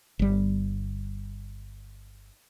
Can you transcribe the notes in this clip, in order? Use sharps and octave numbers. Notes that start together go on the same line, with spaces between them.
G1 G3